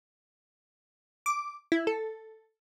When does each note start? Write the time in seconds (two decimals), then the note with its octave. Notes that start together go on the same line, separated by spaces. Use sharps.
1.26 D6
1.72 E4
1.87 A4